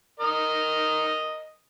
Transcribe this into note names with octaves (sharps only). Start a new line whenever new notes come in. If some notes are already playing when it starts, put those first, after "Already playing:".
A#4 D#5